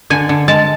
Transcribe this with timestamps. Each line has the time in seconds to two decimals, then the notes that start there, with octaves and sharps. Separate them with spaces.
0.10 D3 G#5
0.29 D3
0.48 G#3 A5